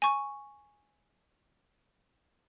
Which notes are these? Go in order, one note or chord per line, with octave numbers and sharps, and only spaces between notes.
G#5 C#6